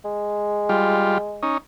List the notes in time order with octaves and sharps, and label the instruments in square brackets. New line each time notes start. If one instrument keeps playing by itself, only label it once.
[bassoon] G#3
[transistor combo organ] G3 F4
C#4 D#4